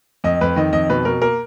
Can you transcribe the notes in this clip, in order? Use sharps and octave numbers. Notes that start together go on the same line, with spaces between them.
F2 D#5
F2 B4
D#3 D#5
F2 D#5
B2 B4
B2 A#4
A#3 A#4